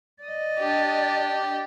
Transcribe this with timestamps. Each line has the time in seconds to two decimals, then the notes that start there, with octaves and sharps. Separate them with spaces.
0.23 D5 D#5
0.59 D4 G4